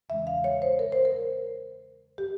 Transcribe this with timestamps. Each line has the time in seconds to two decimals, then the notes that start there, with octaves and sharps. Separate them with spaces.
0.09 E2 C#3 E3 G#3 C#4 E5
0.27 F5
0.44 C#5
0.62 C5
0.79 A#4
0.92 C5
1.05 A#4
2.18 G4